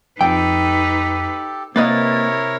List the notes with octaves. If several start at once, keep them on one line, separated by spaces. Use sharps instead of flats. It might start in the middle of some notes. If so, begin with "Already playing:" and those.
F2 D#4 G4 A4 B4 G5
C3 A#3 E4 A#4 B4 C#5 D#5 A6